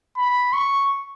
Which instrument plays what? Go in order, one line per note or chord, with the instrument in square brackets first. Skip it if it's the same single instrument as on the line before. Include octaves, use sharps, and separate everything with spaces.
[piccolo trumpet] B5
C#6